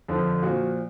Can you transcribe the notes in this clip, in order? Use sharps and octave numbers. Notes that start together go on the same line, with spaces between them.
F2 D3 F3
A#2 F3 F#4